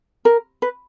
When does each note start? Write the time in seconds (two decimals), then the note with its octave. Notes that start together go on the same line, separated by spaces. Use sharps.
0.25 A#4
0.62 B4